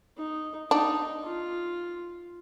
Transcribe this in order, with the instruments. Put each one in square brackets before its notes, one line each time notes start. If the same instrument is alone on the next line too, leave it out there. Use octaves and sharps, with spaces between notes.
[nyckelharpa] D#4
[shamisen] D4 [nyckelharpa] D#4
[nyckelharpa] F4